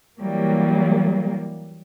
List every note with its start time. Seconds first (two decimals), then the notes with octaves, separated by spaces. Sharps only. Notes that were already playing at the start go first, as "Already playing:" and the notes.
0.21 E3 F#3 G3 A#3